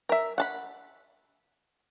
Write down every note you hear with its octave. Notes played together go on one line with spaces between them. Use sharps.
A#4 E5
F#5 A5 B5